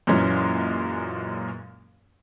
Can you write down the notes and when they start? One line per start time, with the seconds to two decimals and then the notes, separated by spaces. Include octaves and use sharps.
0.07 F#2 A#2 E3 G#3 C#4